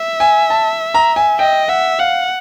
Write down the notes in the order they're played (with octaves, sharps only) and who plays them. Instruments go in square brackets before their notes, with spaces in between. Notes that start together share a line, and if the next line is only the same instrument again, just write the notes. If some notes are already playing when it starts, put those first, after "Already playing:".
Already playing: [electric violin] E5
[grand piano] G#5
A5
A#5
G#5
[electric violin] D#5 [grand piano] G5
[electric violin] E5 [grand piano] F#5
[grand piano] F5 [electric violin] F#5